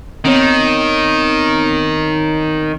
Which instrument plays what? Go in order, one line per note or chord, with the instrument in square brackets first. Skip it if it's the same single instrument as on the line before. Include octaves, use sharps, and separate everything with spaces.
[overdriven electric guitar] D#3 [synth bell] B3 C4 C#5